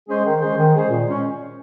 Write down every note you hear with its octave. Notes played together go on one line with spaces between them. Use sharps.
G#3 C#4 G#4 C5
D#3
G#3 C#4 G#4 C5
D#3
G#3 C#4 G#4 C5
A#2
G#3 C#4